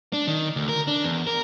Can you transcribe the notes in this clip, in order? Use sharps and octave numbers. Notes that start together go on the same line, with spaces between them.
D4
D#3
D2
A#4
D4
E2
A#4